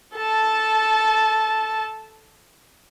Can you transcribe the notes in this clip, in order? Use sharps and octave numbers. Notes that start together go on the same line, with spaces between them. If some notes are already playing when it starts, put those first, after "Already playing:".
A4 A5